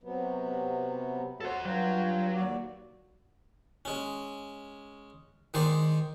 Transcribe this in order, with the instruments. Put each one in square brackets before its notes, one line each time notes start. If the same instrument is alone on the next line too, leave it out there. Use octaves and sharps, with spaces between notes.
[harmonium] C3 F#3 B3
[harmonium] F#4 C#5 [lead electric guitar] A4 C5
[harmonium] G2 F4 G5 [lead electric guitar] F#3
[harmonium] D#2 F#4 D5
[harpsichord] G#3 C#4
D#3 G#3 C5 D5